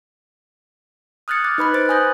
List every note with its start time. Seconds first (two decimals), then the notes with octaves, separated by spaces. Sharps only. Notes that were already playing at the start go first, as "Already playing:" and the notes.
1.28 D#6 F6 F#6 G#6 A6 C#7
1.44 D6 F#6 A6
1.58 D#4 B4 B5 F#6
1.74 C5 A6 D7
1.89 G#5 D#6 F#6 G6 A#6